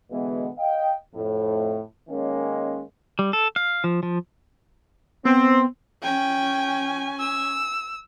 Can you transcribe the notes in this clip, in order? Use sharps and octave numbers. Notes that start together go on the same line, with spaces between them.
B2 D3 E3 G#3 B3
D#5 F5 G5
F2 A2
D#3 G#3 A#3 C#4
G3
A4
F5
F3
F3
B3 C4
C#4 G5 G#5
E6